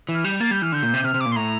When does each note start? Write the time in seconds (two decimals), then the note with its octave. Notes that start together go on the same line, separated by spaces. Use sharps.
0.09 E3
0.14 F6
0.24 G3 G6
0.40 A#3 A6
0.51 G3 G6
0.62 E3 F6
0.72 D3 G6
0.83 A#2
0.94 C3
1.04 C3 F6
1.14 C3
1.20 D6
1.26 A#2
1.31 C6
1.36 A2 A#5